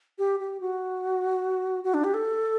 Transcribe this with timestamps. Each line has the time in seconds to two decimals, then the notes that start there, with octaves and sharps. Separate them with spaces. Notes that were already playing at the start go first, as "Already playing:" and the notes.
0.19 G4
0.40 G4
0.61 F#4
1.84 F#4
1.94 D4
2.04 G4
2.14 A4